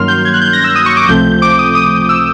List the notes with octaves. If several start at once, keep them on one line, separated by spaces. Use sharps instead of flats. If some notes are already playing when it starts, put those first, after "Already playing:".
Already playing: G2 D#3 F#3 A#3 C#4 C6 F6
G6
G#6
F#6
G6
A#6
E6
D#6
C#6
D6
C#2 C3 F3 A3 C4 G6
D6
D#6
D#6
E6